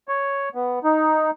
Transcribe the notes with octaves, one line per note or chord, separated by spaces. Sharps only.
C#5
B3
D#4